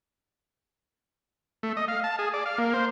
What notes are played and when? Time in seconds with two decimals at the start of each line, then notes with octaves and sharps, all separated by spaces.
1.63 A3
1.77 D#5
1.88 F5
2.04 A5
2.19 G#4
2.34 D5
2.46 F5
2.58 A#3
2.74 C5